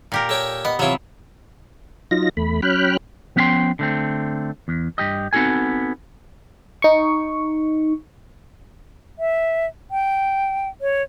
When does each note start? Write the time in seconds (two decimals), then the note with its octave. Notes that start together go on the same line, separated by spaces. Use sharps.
0.12 A#2 G4 A#4
0.29 A4 C#5 G5
0.65 B3 D#5
0.79 C3 E3 F#3 F4 C#5
2.11 F#3 D#4 F4 A#6
2.37 E2 A3 B5
2.62 F#3 C#4 G5 B5 F6 F#6
3.36 F3 B3 C#4 E5 G5 C6
3.79 D3 A3 C4
4.68 E2
4.98 G2 G4 D#5
5.33 B3 C4 D#4 F#4 A4 G#5
6.82 D#4 C#6
9.19 E5
9.91 G5
10.81 C#5